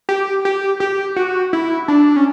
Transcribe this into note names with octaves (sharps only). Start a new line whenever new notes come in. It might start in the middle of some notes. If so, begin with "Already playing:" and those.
G4
G4
G4
F#4
E4
D4
C#4